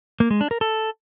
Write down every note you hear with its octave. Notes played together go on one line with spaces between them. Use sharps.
A#3
G#3
D4
A#4
A4